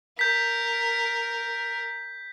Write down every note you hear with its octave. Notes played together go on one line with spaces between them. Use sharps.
A#4 G6 B6